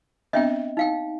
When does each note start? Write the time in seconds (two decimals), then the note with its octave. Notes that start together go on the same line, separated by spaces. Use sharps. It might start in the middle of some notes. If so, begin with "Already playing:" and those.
0.33 B3 C4 D4 D#5 E5 G5
0.77 D#4 F5 G5